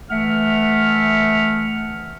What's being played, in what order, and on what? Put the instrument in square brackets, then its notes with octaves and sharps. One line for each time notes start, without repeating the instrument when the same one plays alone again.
[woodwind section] E3 A3 E5 F#5 F6